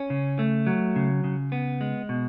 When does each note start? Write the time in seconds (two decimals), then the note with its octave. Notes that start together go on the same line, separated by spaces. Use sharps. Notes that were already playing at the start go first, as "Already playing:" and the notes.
Already playing: C#4
0.10 C#3
0.39 A3
0.67 F#3
0.96 C#3
1.24 C#3
1.52 B3
1.81 G#3
2.09 B2